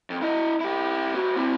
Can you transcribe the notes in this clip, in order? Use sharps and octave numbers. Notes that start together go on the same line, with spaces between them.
F2
E4 D#5
E4 G4
A#3 F#4
C4 E4